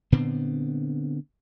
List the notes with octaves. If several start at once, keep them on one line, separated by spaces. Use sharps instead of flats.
A#2 D3 B3 C4